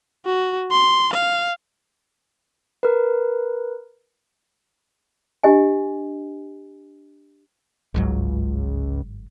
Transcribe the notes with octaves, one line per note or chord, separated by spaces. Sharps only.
F#4
C6
F5
A#4 B4
D4 G4 D#5 G#5
G1 C#2 G#2 F#3